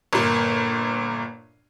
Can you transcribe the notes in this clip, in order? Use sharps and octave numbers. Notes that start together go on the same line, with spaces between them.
G1 A#2